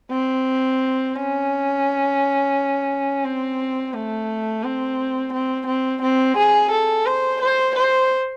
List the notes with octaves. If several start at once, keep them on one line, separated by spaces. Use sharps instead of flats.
C4
C#4
C4
A3
C4
C4
C4
C4
G#4
A4
C5
C5
C5